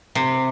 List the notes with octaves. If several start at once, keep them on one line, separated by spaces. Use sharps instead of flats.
C3